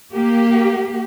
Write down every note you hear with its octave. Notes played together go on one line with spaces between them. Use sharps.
A#3 G4